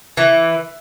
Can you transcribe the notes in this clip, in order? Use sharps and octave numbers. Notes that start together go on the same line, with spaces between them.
E3